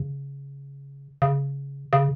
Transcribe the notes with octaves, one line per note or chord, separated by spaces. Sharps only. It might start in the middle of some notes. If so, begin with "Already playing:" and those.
Already playing: C#3
C#3
C#3